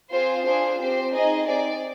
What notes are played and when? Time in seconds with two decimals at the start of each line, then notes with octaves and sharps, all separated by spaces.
0.11 C4 F4 G#4 C5
0.44 D4 F4 G#4 C5
0.78 C4 G4 C5
1.13 C4 D#4 G#4 D#5
1.47 C4 D#4 G#4 D5